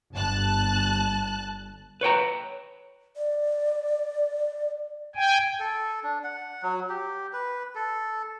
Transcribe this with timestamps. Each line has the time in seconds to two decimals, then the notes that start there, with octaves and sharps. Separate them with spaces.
0.14 G1 A5 F#6
2.01 B4 C#5 G5 A#5
3.16 D5
5.15 G5 G#5
5.60 A4
6.03 D4
6.24 F#5
6.63 F#3
6.89 G4
7.33 B4
7.75 A4